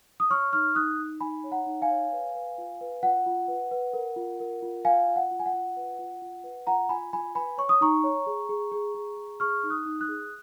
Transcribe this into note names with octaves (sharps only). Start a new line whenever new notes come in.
D#6
C#5 C#6 F6
D#4 C#6 F6
D#4 D#6 F#6
D#4
D#4 G#5 B5
C#5
F#5 A#5
D#4
F5 G#5
C#5
B4
B4
F4
B4
F4 F#5
F4
B4
B4
A#4
F4
A#4
F4
F4 F5 G#5
F4
F#5
F4
G#5
F#5
F4
B4
F4
F4
B4
F4 F#5 A#5
F4 G#5 B5
F4 G#5 B5
B4 G#5 B5
C#5 C#6
D#6
D#4 A#5 C#6
C#5
G#4
G#4
G#4
G#4
G#4
G#4 C#6 F6
D#4
D#6 F#6
D#4
D#6 F#6
G#4